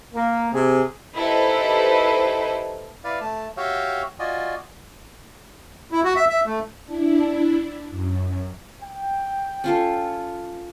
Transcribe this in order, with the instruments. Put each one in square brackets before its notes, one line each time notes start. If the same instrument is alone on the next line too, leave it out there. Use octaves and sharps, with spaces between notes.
[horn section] A#3
C3 G#4
[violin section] D#4 E4 G4 A4 B4 C5
[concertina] E4 B4 D5 F5
A3 A5
F#4 G4 C#5 E5 F5 G5
F4 F#4 D5 D#5 G#5
[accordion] E4
F#4
E5
E5
A3
[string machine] D4 E4
F#2
[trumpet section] G5
[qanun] C#4 F4 A4